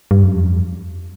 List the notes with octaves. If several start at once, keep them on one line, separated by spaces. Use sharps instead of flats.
G2
F#2
F2